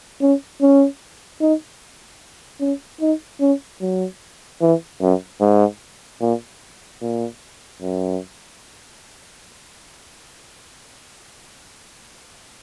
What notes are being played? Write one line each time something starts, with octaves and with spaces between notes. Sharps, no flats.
C#4
C#4
D#4
C#4
D#4
C#4
F#3
E3
F#2
G#2
A#2
A#2
F#2